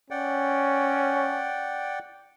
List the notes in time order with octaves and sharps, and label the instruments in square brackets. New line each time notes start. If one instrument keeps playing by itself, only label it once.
[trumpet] C#4 [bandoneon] D5 F#5 G5